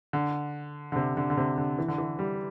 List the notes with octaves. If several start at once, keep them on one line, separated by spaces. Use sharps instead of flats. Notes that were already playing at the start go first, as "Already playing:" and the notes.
D3
D3
C3
D3
D3
C3
D3
E3
D3
E3
G3